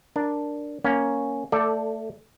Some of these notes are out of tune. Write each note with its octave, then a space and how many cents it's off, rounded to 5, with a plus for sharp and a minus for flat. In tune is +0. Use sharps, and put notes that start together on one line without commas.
D4 +0 A#4 +0
A#3 +0 C#4 +0
A3 +20 A4 +0 D5 +0